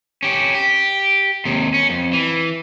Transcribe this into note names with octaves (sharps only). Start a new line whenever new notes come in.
C#4 G4
G4
D#2 C3
C#4
F2
E3